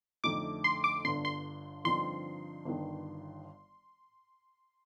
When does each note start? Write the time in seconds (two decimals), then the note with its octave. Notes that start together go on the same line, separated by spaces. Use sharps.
0.24 F2 D3 A3 D#4 D6
0.64 C6
0.84 D6
1.05 G1 G2 D3 C6
1.25 C6
1.85 G2 D3 F3 C4 D#4 C6
2.65 G1 G2 D#3